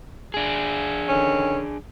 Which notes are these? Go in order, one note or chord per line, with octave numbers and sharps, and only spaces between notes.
D4 G#4
D3 D#3 C#4